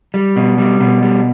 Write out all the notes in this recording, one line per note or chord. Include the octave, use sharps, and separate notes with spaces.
G3
B2
G3
B2
G3